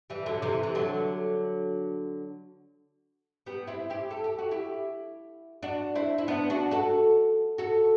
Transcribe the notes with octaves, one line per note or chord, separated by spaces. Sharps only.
E3 G3
D3 F#3
C3 E3
E3
D3 F#3
G3 B3
C4 E4
E4 G4
A4
G4
F#4
E4 G4
D4 F#4
C4 E4
E4
B3 D4
D4 F#4
F#4 A4
F#4 A4